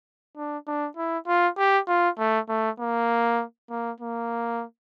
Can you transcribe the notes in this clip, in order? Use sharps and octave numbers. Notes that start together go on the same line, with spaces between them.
D4
D4
E4
F4
G4
F4
A3
A3
A#3
A#3
A#3